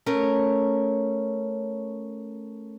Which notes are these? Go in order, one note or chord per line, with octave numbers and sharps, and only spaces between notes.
A3 C#4 A#4 C#5